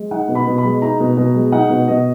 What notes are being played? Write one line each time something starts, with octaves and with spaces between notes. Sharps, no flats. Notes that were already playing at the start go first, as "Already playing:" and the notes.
Already playing: G#3
D#4 F#5
B2
B5
B2
B5
G#3
D#4 A#5
B2
B2
G#3
D#4 F#5
B2
B2 D#5